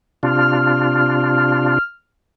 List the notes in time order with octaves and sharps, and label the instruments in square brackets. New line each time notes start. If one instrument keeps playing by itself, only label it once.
[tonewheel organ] C3 D4 F4 [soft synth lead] F6